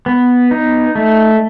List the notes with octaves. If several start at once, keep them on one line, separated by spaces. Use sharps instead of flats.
B3
D#4
A3